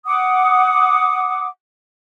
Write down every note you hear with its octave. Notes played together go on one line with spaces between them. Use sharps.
F#5 D6 D#6